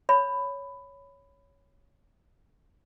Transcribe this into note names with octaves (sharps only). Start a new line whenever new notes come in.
C#5 B5